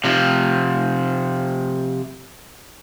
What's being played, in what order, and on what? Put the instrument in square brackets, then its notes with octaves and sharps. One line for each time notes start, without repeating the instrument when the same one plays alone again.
[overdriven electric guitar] C3 F3